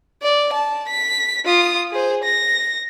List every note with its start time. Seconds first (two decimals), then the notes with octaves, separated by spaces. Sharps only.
0.22 D5
0.53 A5
0.88 B6
1.45 F4 D#6
1.91 G#4 C5
2.24 A#6